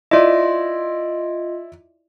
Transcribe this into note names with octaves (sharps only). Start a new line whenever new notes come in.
E4 F4 D5 D#5